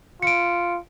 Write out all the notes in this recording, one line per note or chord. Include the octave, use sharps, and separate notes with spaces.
F4 C#7 D7